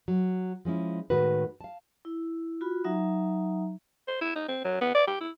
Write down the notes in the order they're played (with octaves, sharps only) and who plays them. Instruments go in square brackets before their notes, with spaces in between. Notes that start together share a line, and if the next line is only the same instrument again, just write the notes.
[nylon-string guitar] F#3
F3 G#3 C#4 E4
A2 D#3 G#3 F#4 B4
F5 A5
[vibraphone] E4
F4 F#4 B5
F#3 D#4 E5 A#5
[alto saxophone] C5
E4
D#4
C4
F#3
B3
D5
G4
E4